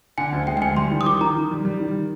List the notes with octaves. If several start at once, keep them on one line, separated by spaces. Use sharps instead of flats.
D3 G#5
D2
G#3 G5
G5
D2 G#5
G3 C6
D#3
D#6
D#3 D6
D#3 A#5
D#3
G3
G3
D#3